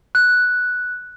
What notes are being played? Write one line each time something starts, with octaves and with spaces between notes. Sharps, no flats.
F#6